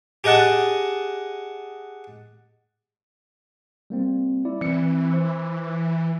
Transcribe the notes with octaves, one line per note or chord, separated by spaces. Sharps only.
G4 G#4 D#5 F#5 A5
G3 A#3 C4
E4 D5
E3 C4 C#7
C5